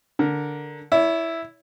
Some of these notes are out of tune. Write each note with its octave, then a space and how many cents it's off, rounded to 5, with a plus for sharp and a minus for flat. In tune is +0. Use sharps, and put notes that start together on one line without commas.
D3 -5 A#4 +0
E4 +0 C#5 +40